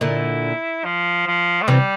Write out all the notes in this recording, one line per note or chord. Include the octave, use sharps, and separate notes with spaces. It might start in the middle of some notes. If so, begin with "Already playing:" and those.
A#2 D3 E4
F3
F3
A3
C3 E3 G3